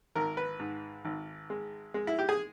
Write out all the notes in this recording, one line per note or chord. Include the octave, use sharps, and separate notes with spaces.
G#1 A#4
B4
G#2
G#1
G#3
G#3
E4
G4
G#4